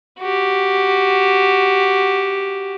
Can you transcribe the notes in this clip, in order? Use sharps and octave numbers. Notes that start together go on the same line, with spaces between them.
F#4 G4